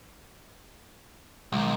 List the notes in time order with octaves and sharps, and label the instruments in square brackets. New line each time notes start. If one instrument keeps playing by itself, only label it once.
[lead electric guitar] B1 [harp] D#3 F3 G#3